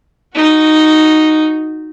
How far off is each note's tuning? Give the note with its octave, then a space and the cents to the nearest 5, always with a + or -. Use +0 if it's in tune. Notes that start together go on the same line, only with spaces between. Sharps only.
D#4 +0 F#4 +0